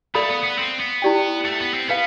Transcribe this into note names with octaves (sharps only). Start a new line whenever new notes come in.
A3 A4 D5 F5 B5
B3
B3
C4
B3
E4 G4 D5 G5
A3
B3
C4
B3 B4 F5